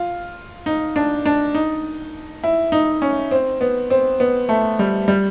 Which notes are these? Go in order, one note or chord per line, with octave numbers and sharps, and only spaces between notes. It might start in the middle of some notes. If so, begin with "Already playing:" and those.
Already playing: F4
D#4
D4
D4
D#4
E4
D#4
C#4
C4
B3
C4
B3
A3
G3
G3